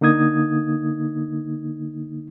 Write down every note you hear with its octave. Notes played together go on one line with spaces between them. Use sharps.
D3 A#3 D#4 D#6 G#6